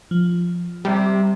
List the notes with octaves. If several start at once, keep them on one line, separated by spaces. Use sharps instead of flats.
F3
C3 G3